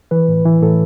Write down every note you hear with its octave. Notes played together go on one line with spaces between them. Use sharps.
E3 B4
A2
E3
A2 A4